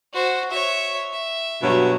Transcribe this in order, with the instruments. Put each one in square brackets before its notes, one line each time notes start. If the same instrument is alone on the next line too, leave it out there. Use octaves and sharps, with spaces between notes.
[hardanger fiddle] F#4 C5
C#5 E5
E5
[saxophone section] G2 B2 F#3